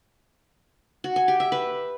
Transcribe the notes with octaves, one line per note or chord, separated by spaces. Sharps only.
F#4
G#5
G4
E5
B4